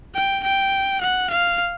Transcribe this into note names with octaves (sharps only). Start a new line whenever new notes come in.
G5
G5
F#5
F5